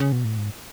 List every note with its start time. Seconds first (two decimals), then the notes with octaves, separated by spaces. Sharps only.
0.00 C#3
0.12 B2
0.24 A2
0.37 G#2